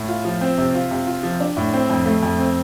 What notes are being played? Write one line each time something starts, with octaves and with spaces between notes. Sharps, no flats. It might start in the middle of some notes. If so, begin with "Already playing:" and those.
Already playing: A2
F4
F3
C4
C3
F4
C3
F4
F3
D4
A2
C4
F2
A3
F2
C4